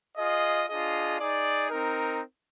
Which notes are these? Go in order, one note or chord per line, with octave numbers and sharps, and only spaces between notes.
F4 G#4 D#5
D4 F4 G#4 D#5
D#4 G#4 D5
C4 D#4 A#4